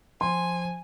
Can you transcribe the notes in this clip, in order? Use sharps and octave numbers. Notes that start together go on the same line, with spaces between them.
F3 G#5 C6